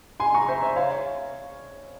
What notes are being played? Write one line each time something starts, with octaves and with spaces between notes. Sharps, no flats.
G#5 C6
A#5 C#6
C5 E5
C5 E5
C#5 F5